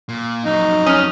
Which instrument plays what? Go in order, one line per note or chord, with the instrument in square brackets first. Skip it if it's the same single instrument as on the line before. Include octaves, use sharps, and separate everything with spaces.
[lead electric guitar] A#2
[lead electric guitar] F2 F#3 [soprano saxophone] D#4
[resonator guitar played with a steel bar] C#4 [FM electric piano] D#6 F6